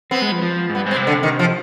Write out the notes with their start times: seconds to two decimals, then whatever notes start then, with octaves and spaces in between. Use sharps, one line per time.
0.11 B3 C4
0.22 G#3
0.32 F3
0.42 F3
0.70 G#2
0.75 G2 B3
0.86 G#2 C4
0.96 C3
1.07 D3
1.23 D#3
1.39 F3